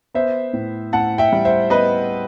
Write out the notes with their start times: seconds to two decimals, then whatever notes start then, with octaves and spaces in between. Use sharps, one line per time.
0.14 B3 C5 E5
0.53 A2
0.93 A2 F#5 A5
1.18 E5 G5
1.32 G3
1.45 C5 E5
1.70 B3 B4 D#5